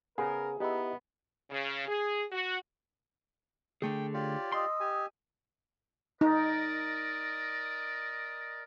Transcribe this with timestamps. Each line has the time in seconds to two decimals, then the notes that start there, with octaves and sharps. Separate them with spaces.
0.18 C#3 B3 G#4 A#4
0.60 B3 D#4 E4 G4 D#5
1.50 C#3
1.87 G#4
2.32 F#4
3.82 D3 A3 G#4 G5
4.14 F4 G4 C#5 D5
4.52 D#5 C6 D#6 E6
4.80 G4 G#5
6.21 D#4 A#4 D5 D#5